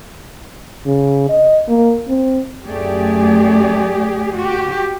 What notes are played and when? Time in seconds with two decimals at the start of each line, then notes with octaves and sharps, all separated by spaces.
0.86 C#3
1.29 D#5
1.68 A#3
2.08 C4
2.67 F#2 A3 G4 G#4 D5
4.36 F#4 G4